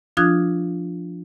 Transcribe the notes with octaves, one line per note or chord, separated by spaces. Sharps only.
F3 D4 F4 D#6 F#6 G#6